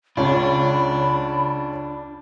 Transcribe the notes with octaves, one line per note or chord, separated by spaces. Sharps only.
C#2 C#4 D4 B5